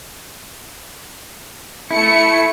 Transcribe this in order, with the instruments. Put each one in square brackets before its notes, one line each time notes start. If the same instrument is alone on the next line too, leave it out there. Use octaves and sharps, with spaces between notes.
[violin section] A3 C#7 [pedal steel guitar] E4